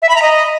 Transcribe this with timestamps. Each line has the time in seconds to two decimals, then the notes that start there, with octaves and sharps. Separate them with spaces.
0.02 E5
0.09 B5
0.15 A#5
0.22 D#5